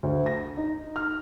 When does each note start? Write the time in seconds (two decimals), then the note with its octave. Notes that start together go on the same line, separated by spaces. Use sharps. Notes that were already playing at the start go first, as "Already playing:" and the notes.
0.03 D2
0.26 A#6
0.57 D#4
0.96 F6